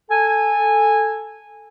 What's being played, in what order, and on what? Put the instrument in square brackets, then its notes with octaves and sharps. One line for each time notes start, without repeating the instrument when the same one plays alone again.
[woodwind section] A4 G#5